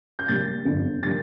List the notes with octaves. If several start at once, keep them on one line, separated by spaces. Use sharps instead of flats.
G6
A#1 A#2 G3 A6
G1 F2 D3
D3 G3 A#3 D4 A6